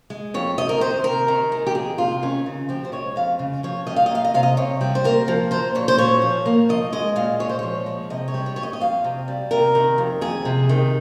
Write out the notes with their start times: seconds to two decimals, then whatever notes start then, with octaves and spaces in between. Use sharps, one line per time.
0.10 G#3
0.34 F2 C#5
0.58 C3 D#5
0.69 A#4
0.81 D#3 C5
1.04 C3 A#4
1.28 D#3
1.52 G#3
1.67 G4
1.75 F2 G#4
1.98 C3 F4
2.22 D#3 C#4
2.46 C#3
2.69 F3 G4
2.85 C5
2.92 G#3 C#5
3.16 F2 F5
3.39 C#3
3.63 F3 C#5
3.87 G3 D#5
3.96 F5
4.06 D#5
4.10 A#3 F5
4.25 D#5
4.34 C3 F5
4.43 D#5
4.57 C3 C#5
4.81 G3
4.95 C5
5.04 A#3 A#4
5.28 F3
5.51 A#3 C5
5.75 A#2 C#5
5.88 C5
5.98 A#2 C#5
6.22 F3
6.46 A#3
6.69 F3 D#5
6.92 G#3 D#5
7.16 A#2 F5
7.40 A#2 C#5
7.49 C5
7.59 F3 C#5
7.86 G#3
8.10 C3 D#5
8.28 C#5
8.34 G3
8.46 C#5
8.56 F2 C#5
8.63 D#5
8.73 D#5
8.80 F2 F5
9.04 C3
9.28 G3
9.51 C3 A#4
9.75 D#3
9.98 F2
10.21 F2 G#4
10.45 C3
10.69 D#3